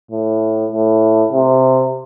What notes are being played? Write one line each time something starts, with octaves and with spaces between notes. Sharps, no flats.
A2
A2
C3